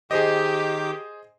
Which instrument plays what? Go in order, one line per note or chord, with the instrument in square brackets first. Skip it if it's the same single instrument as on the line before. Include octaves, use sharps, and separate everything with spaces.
[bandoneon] D#3 D6 G6 [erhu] G4 [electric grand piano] G#4 C5 D#5